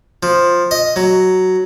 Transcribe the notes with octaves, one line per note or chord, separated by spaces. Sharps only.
F3
D#5
F#3